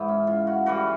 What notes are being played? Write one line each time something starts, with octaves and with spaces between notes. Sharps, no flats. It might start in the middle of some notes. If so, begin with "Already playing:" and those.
Already playing: G#2 E3 G#3
C#4
F4
F#4
A2 E3 G3 F#4